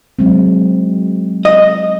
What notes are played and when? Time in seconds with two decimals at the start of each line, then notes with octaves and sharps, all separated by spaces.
0.19 F#3 G#3 C4
1.45 D#5